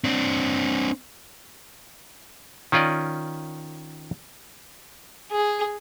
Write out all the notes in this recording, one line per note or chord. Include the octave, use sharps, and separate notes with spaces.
C4 D4
D#3 C#4 F4 D5 D#5
G#4